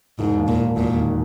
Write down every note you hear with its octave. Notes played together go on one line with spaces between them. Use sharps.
E1 G#2
D#2
A#2
E1
E1 A#2
D#3